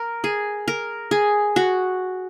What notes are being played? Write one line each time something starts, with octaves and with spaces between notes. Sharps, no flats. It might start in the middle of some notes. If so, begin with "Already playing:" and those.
Already playing: A#4
G#4
A#4
G#4
F#4